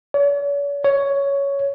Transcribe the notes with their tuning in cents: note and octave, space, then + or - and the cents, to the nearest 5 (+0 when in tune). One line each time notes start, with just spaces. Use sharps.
C#5 +45
C#5 +10